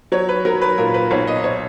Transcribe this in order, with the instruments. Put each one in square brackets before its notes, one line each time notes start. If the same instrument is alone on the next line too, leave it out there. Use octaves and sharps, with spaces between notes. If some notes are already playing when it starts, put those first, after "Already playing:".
[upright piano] F#3 C#5
B4
F#3 A#4
B4
A#2 A#4
B4
B1 C#5
D#5
C#5